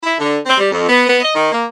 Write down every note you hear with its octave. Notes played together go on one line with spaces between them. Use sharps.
E4
D3
C4
G3
F2
B3
B3
D#5
D#3
A#3